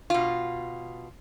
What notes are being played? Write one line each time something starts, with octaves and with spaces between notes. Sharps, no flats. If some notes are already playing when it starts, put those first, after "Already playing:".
B2 F4